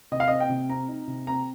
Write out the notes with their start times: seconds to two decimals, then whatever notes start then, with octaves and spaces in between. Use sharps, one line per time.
0.12 C3 D#5
0.20 F5
0.28 C4 D#5
0.40 G5
0.49 C3
0.69 C4 A#5
0.88 D#4
1.08 C3
1.27 C4 A#5